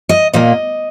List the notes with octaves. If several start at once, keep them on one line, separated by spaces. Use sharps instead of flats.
D#5
A#2 A#3 D#5